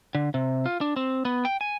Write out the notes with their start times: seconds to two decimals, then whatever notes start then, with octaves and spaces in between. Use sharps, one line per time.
0.15 D3
0.34 C3
0.66 F4
0.81 D4
0.96 C4
1.25 B3
1.45 G5
1.61 G#5